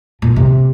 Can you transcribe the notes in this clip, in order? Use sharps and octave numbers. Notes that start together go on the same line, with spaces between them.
A#2
C3